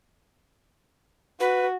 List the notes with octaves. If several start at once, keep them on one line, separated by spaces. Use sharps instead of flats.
F#4 B4